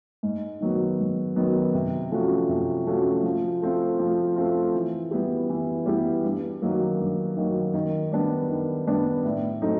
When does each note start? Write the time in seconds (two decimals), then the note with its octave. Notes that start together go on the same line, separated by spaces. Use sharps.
0.23 G#2
0.61 D#3 F#3 B3
0.99 G#2
1.36 D#3 F#3 B3
1.74 C3
2.11 F3 A3 C#4 F#4
2.49 C3
2.86 F3 A3 C#4 F#4
3.23 F3
3.62 A3 C4 F4
3.99 F3
4.36 A3 C4 F4
4.75 E3
5.11 G3 B3 E4 G4
5.49 E3
5.86 G3 B3 E4 G4
6.24 G2
6.62 D#3 F#3 A#3
6.99 G2
7.37 D#3 F#3 A#3
7.74 D#3
8.12 G3 B3 D4
8.49 D#3
8.87 G3 B3 D4
9.24 A2
9.62 F#3 A3 C4 D#4